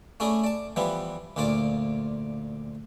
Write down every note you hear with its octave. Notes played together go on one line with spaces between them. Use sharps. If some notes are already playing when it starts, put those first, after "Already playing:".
A3 C#4 E4 G#4 D5
D5 A5
E3 F3 G3 B3 E4
D2 A#2 A#3 F4 D5 D6